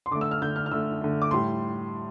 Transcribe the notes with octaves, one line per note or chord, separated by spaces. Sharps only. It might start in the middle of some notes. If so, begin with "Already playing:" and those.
C6
D3 A3 D6
E6
F6
D3 A3 G6
F6
F6
D3 A3 E6
D3 A3
D6
A2 G3 C6